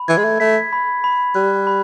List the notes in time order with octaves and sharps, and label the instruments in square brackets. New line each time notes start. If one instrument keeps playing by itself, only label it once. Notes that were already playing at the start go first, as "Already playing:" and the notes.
Already playing: [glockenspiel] B5
[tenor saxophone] E3 [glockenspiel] G#6
[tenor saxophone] G#3
A3
[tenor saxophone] A3 [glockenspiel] B6
[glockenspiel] B5
B5
[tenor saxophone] G3 [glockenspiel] F#6
[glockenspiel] B5